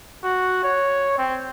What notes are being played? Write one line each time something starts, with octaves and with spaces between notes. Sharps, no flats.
F#4
C#5
C4